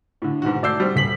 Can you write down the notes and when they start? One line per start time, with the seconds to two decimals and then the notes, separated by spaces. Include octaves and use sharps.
0.22 A2 D3
0.42 G#2 B2 D#3 F#4
0.63 A3 D5 E6 G6 C7
0.80 G3 C4 F#4
0.95 D#1 B6 F#7